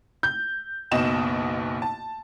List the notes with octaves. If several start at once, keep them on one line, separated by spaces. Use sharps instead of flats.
G6
F#1 B1 B2 D#5 E7
A5